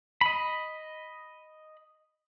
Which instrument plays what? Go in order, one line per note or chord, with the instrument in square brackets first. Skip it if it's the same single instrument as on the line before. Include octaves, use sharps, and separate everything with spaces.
[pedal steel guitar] D#5 B5